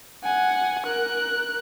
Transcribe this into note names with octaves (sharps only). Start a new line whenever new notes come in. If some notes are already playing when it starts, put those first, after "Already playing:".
F#5 G#5
A#4 F#6